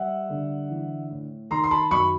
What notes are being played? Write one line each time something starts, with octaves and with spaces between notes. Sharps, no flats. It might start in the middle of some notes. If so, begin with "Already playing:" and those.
Already playing: G3 E5 F#5
D3
E3
A2
D#3 A#5 C6
C6
A5 B5
F#2 B5 C#6